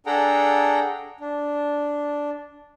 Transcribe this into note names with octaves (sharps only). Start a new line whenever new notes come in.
D4 G#4 A4 F#5 G5 A#5
D4